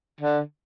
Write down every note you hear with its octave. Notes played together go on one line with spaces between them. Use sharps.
D3